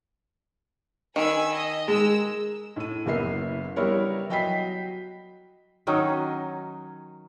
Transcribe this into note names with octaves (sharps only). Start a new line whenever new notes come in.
D#3 G#5 B5 E6
D#5
G#3 A#5 E6
A2 D#7
F#1 A#3 B3 E5 C7
G3 B3 E4 A#4 C#5
F#3 D#5 G5 B5 B6 C7
D#3 F#3 C#4 D#4